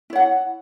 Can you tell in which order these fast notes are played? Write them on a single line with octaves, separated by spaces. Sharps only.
E4 C#5 F#5